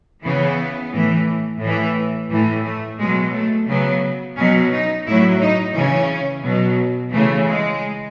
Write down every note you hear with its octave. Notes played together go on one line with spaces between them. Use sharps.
C#3 E3 B3
A2 E3
A2 E3
A2 E3
A3
B2 F#3 G#3
A3
C#3 F#3 B3
B2 F#3 C#4
D#4
A2 F#3 E4
D#4
C#3 E3 C#4
B2 F#3
C#3 E3 A3
G#3